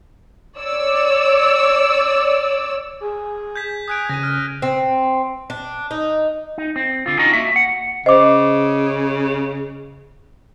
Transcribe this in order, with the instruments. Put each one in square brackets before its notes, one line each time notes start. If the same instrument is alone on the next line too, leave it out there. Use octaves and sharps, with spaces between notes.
[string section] C#5 D5 E6
[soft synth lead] G#4
[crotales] G6 G#6 B6
[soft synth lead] G#5 [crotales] D#6 F#6 D7
[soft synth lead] C#3 [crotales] A#6 D#7
[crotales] F6
[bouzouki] C4
D4
D#4
[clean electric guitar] D#4
C4
D3 F4
C#4 D#4 F4 F#4 D#5 A#5
A#3 F#4 E5
F#5
[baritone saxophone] C#3 [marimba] C5 [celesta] D#5 D6